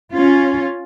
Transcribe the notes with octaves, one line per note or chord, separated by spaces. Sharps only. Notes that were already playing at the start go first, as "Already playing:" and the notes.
C#4 F4